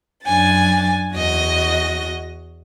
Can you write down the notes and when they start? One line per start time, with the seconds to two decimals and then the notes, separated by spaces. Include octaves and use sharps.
0.25 F#2 D4 G#5 A6
1.14 E2 F#4 D#5 A#6